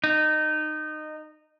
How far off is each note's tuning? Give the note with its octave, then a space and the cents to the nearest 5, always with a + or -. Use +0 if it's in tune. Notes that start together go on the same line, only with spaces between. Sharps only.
D#4 -20